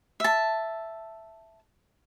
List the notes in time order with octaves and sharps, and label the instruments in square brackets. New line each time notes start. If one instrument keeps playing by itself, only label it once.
[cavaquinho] E5 A5